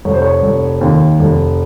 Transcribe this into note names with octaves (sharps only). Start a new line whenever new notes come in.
F1 C#5
C5
C#5
F1
D#2
F1